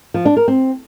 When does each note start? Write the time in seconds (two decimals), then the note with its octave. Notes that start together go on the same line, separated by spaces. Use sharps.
0.14 F3
0.25 D4
0.37 A#4
0.48 C4